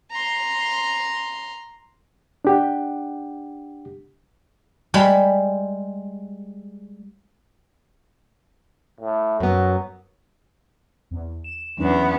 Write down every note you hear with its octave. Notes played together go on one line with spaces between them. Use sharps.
A#5 C6
D4 G4 F#5
G3 G#3 B5
A2
F#2 F#3 B3
E2
E7
E2 F#3 B3 C#4 D4